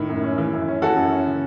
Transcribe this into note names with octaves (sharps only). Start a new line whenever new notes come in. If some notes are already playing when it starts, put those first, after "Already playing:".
Already playing: A2 D#3
F#2
C#4
E3
F#2
C#4
E3 F#4 A4
F#2
C#4
C#3